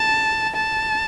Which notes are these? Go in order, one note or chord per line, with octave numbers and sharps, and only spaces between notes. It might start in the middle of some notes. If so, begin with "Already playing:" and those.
Already playing: A5
A5